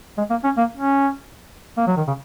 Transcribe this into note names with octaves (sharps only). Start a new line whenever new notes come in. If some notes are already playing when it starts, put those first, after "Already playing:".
G#3
A#3
C#4
A#3
C#4
A#3
F#3
D#3
C#3